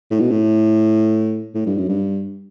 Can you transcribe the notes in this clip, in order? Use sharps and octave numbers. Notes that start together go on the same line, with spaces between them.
A2
B2
A2
A2
G2
F#2
G2